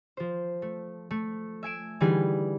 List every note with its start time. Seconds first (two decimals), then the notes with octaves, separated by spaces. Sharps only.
0.17 F3 C5
0.62 A3
1.11 A3
1.63 E5 G#5 D7 E7
2.00 D3 E3 G3 D#4 G#4 B4